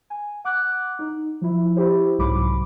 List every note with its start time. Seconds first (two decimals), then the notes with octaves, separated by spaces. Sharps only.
0.10 G#5
0.44 F#5 D6 F#6
0.99 D#4
1.41 F3 E4
1.77 E4 G4 C5
2.19 C2 G#2 F#3 B5 D6